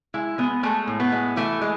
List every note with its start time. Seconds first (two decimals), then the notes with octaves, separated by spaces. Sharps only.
0.14 G#3 E4
0.38 G#3 B3
0.63 G#3 A3
0.87 A2
1.00 B3
1.12 G#3
1.36 E3 A3
1.62 G#3